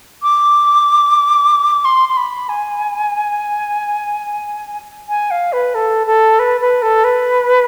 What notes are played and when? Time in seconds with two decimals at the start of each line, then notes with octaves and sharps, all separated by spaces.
0.23 D6
1.85 C6
2.09 C6
2.17 B5
2.49 G#5
5.09 G#5
5.31 F5
5.53 B4
5.75 A4
6.07 A4
6.39 B4
6.61 B4
6.82 A4
7.04 B4